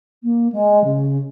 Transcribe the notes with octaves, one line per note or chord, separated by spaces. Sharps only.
A#3
G#3
C#3